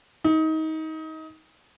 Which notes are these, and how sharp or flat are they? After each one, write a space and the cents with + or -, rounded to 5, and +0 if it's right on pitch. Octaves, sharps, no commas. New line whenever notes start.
D#4 +25